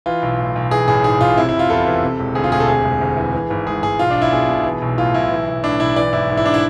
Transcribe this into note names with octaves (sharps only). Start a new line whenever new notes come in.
E3 F4
B1
A2
B1
E3 G#4
A1 G#4
G#2 G#4
A1 F4
C3 E4
E4
F1
F4
E2 A4
E3
C3
E1
D2 G#4
F4
E1 G#4
A4
C3 G#4
E1
D2
E3
E3
G#1
G#2 G#4
G#1 G#4
B1 F4
D4
B1
E4
B2 G#4
B2
E3
B1
A2 F4
B1 E4
E3
B1
A2 D4
B1 E4
E3 D5
G#1 E4
G#2
E4
D4
E4